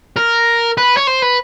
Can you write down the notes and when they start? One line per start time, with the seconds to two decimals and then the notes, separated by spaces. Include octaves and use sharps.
0.16 A#4
0.78 B4
0.97 C#5
1.07 C5
1.22 B4